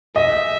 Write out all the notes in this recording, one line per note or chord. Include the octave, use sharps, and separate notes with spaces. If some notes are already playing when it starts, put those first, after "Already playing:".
D#5 E5